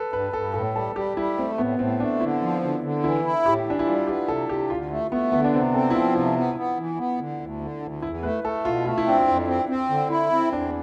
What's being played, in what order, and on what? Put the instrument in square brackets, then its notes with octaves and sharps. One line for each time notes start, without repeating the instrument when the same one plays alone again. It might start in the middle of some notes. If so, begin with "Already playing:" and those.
Already playing: [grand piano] A4 B4
[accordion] G2 [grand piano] B4
[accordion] G2 [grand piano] A4
[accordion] A2 [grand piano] A4
[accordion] G3 [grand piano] A4
[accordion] G3 [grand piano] G4
[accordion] G3 [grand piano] E4
[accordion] A3 [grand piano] C4
[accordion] A2 [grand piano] B3
[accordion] A2 [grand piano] C4
[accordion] A3 [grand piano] D4
[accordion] D3 [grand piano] E4
[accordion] F3
D3
D3
[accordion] E3 [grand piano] E4
[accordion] E4
[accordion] A2 [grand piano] G4
[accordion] E3 [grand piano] D4
[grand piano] E4
[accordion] G3 [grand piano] F4
[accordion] B3 [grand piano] G4
[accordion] C3 [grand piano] A4
[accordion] C3 [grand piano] G4
[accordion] D2 [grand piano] F4
[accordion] A3
[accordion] A3 [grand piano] B3
[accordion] D3 [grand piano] B3
[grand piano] D4
[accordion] C3 [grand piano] C4
[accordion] C4 [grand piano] A4
[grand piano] E4
[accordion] F3 [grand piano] F4
[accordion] C3 [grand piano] E4
[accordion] B3
B3
E3
B3
D3
D2
D3
D2
[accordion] E2 [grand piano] E4
[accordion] A3 [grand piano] B4
[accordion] A3 [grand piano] A4
[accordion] B2 [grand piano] F4
[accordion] A3 [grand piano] F4
[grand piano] E4
[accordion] C4 [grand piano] D4
[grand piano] E4
[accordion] F2
C4
C4
D3
E4
C4
[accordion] E2 [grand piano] D4